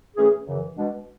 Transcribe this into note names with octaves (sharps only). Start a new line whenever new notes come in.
A2 E3 A3 C#4 G#4
F#2 C#3 E3
B2 G#3 D4